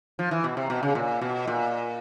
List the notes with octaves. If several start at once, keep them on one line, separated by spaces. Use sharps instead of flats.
F3
E3
B2
C3
B2
C#3
A#2
B2
A#2